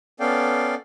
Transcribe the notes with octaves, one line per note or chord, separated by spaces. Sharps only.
B3 C#4 A4 D5 F5 G5